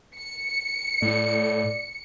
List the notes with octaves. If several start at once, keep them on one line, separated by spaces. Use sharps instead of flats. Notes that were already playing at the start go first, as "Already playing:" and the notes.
C#7
A2 D5